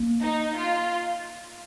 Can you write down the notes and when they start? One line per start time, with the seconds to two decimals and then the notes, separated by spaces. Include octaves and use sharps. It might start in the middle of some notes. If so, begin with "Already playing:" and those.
Already playing: A#3
0.23 D#4
0.57 F4